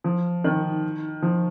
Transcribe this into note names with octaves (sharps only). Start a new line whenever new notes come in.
F3
D#3
F3